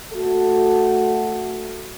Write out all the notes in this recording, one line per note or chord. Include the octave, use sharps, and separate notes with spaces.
A3 F#4 A4